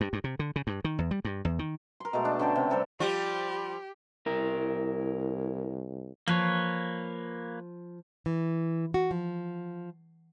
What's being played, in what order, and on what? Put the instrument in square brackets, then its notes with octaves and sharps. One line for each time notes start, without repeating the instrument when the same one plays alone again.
[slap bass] G2
G2
C3
D3
C#3
G2
D#3
E2
G3
G2
E2
D#3
[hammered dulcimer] A#4 C6
B2 G#3 A3
D4
D3 C#4 A4 G5
C3
G3 C4 A4 A#4
[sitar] F3 G3 F4 [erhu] G4
[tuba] C2 [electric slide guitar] E4 A#4
[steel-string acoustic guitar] F3 [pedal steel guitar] A#3 B4 C#5
[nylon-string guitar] E3
F#4
F3